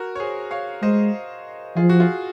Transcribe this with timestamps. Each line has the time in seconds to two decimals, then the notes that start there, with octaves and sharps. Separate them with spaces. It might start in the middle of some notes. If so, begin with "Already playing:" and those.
Already playing: F#4 A#4
0.15 C#5
0.20 G#4 C5
0.51 C#5 F5
0.82 G#3 C5 D#5
1.76 F3 F4 G#4
1.89 F#4
2.00 F4 G#4